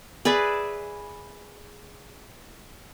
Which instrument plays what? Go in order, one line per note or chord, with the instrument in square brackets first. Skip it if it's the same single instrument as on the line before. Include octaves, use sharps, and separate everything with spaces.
[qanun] G#4 B4 D5 E5